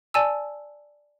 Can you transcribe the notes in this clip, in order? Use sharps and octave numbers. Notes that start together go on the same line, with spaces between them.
D5 G#5 A5 E6